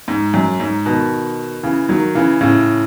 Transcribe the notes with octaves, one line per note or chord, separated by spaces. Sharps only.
G#2
F#2
G#2
B2 D#3
C#3 E3
D#3 F#3
C#3 E3
A2 C#3